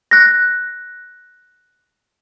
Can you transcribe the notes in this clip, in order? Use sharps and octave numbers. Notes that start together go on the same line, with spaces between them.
F#6 A#6